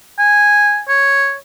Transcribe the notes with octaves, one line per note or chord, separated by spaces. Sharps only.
G#5
C#5